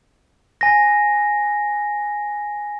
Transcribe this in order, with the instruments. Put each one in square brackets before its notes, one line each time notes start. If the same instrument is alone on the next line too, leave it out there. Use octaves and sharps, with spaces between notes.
[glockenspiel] G#5 A#6